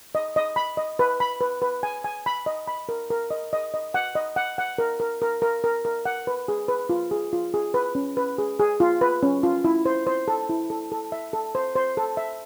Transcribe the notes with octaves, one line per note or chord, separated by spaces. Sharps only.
D#5
D#5
B5
D#5
B4
B5
B4
B4
G#5
G#5
B5
D#5
B5
A#4
A#4
D#5
D#5
D#5
F#5
D#5
F#5
F#5
A#4
A#4
A#4
A#4
A#4
A#4
F#5
B4
G#4
B4
F4
G#4
F4
G#4
B4
C#4
B4
G#4
G#4
F4
B4
C#4
F4
E4
C5
C5
A4
E4
A4
A4
E5
A4
C5
C5
A4
E5